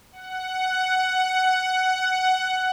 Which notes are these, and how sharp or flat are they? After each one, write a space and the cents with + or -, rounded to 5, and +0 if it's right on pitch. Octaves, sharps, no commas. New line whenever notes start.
F#5 +10